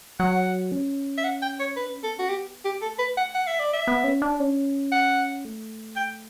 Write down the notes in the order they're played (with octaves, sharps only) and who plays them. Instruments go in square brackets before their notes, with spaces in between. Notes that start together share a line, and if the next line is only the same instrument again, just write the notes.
[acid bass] F#3 [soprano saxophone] F#5
[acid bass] C#4
[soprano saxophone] E5
F#5
G5
C#5
[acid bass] D4 [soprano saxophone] B4
[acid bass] C#4
[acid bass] B3 [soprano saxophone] A4
[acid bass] C#4 [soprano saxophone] F#4
[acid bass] B3 [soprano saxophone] G4
[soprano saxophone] G4
[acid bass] A3 [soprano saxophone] A4
[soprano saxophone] B4
F#5
F#5
E5
D5
E5
[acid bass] B3
C#4
D4
C#4
[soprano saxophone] F#5
[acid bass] A3
[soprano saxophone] G5